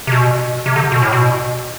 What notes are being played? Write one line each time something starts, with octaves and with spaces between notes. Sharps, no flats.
C3
B2
C3
D3
B2
A2
B2